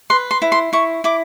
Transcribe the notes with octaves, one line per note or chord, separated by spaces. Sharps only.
B4 C6
C6
E4
C6
E4 C#6
E4 D6